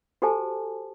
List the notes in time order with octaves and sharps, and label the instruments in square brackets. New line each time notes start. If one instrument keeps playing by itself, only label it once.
[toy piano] F#4 G4 A4 C5 G#5 A5